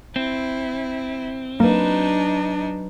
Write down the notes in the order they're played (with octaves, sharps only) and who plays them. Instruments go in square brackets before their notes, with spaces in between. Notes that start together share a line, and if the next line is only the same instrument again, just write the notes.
[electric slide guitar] C4 [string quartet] E4
[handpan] F#3 B4 [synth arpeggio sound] A#3 [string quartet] D4 D#4